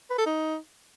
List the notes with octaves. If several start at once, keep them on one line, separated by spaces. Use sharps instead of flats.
B4
A4
D#4